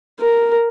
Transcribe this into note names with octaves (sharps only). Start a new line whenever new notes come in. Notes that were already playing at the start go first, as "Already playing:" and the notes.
A#4